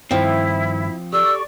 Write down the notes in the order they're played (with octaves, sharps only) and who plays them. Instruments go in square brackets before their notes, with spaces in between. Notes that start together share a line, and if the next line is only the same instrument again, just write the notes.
[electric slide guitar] G2 D#3 [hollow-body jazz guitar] F3 C4 [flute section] E4
[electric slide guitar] G4 A4 [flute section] D5 C#6 [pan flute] E6